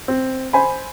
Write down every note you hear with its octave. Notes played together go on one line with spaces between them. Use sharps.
C4
C5 G#5 B5